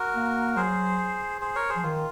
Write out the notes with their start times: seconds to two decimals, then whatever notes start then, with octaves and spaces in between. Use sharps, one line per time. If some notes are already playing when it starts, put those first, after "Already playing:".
Already playing: F#4 A#4
0.15 A#3
0.56 F#3 G#4 C5
1.41 G#4 C5
1.56 A#4 C#5
1.69 G#4 C5
1.76 F3
1.83 D#3 F4